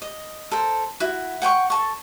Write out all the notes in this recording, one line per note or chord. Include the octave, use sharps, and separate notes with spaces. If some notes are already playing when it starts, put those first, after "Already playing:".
D#5
A4 A#4 C5
E4 F#4
F#5 G5 C6 C#6
A4 A5 C#6